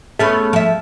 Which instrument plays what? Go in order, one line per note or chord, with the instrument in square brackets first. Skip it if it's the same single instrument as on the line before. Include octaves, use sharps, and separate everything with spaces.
[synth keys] A3 [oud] B3 C#4 G#4
[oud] F3 E5